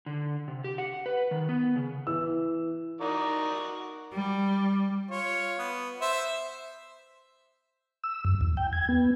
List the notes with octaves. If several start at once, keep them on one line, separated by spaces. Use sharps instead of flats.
D3
C3
G4
F#5
B4
D#3
B3
C#3
E3 E6
D#4 F#4 A#4 D5
G3
F4 C#5
B3
C5 E5
E6
F#2
E2
G5
G#6
B3